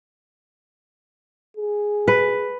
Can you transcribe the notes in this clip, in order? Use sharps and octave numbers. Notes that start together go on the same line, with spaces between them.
G#4
B4